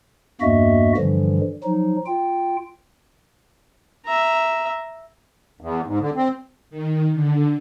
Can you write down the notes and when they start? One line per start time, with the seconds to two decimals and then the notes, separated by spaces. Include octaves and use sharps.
0.41 E2 G2 A#3 F#4 D#5 E5
0.97 G2 D3 E3 F3 G3
1.64 F3 F#3 D#4
2.06 F4 G5
4.05 E5 A#5
5.61 E2
5.86 G#2
6.00 D3
6.16 C4
6.70 D#3
7.14 D3